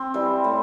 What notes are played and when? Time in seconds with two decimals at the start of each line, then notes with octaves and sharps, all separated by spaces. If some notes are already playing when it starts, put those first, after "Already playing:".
Already playing: C4
0.14 E3 G3
0.44 A2